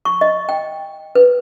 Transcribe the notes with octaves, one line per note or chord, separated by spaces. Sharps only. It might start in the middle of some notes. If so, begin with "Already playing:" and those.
C#6
D#5
G5
B4